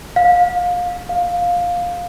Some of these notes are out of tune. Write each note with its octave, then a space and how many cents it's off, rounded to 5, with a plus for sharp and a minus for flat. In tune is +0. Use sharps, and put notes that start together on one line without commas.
F5 +25
F5 +10